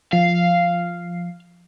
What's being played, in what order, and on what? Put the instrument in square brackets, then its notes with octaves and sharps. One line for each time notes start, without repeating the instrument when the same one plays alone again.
[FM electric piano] F3 C7 [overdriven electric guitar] F5